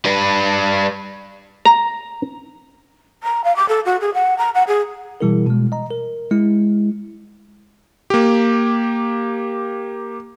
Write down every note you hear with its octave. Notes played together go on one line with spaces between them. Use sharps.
G3 B4
A#5
A#5
F5
D6
A4
F#4
G#4
F#5
A#5
F#5
G#4
B2 E3 G3 E4 G#4 A#4
B2 G#3
D#5 A#5
A#4
G#3 E4
A#3 G4